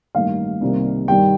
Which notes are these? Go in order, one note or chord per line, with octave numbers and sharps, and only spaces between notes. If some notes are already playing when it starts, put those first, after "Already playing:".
A1 G2 D#3 A#3 F5
C2 C3 D#3 G3 A#3
G2 D#3 G3 G5